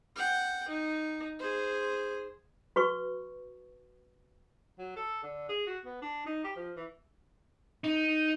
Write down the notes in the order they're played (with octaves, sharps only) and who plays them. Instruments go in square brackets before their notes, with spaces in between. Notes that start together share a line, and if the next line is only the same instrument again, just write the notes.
[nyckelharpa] F#5 G5
D#4
G#4 C5
[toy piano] F#4 B4 C#6
[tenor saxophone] F#3
A4
D3
G#4
F#4
B3
D4
D#4
G4
F3
E3
[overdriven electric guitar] D#4